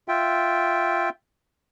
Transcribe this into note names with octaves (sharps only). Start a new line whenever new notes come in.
F4 E5 G5